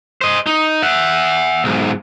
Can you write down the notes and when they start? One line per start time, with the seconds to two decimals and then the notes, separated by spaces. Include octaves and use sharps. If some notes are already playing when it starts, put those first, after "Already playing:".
0.21 C5 D#5
0.46 D#4
0.83 E5 F#5
1.64 B1 G#2